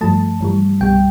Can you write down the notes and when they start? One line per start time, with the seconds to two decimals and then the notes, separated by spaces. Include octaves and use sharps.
0.01 G2 F3 A3 A5
0.41 G2 E3 G3
0.80 C2 B2 G3 G5